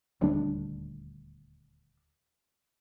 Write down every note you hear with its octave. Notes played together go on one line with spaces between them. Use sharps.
D#1 D2 G3 D4